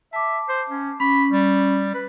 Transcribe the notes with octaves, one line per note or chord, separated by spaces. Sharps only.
E5 A5 D6
C5
C#4
C#4 B5
G3
B4